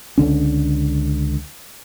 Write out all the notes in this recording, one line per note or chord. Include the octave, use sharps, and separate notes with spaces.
C#2 D3 C#4